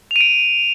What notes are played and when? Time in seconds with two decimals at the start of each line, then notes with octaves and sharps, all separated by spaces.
0.11 F7
0.16 D#7
0.21 D7